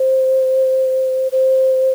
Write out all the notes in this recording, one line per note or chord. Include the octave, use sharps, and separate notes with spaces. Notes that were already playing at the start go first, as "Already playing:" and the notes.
Already playing: C5
C5